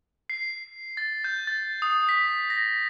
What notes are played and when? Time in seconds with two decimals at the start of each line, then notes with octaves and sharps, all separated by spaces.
0.30 C7
0.97 A6
1.24 G6
1.47 A6
1.82 D#6
2.09 B6
2.50 A#6